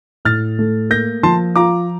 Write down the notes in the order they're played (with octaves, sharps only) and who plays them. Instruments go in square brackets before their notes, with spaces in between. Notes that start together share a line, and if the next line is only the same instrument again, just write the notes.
[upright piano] A2 [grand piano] F6 A6
[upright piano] A3
[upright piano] A#3 [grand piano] G6 A#6
[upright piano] F3 [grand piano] A5 C6
[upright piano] F4 [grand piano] A#5 D6